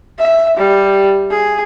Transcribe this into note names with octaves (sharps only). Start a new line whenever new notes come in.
E5
G3
G#4